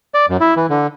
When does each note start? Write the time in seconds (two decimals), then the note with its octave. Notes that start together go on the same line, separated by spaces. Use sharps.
0.14 D5
0.29 F#2
0.41 E4
0.56 E3
0.70 D3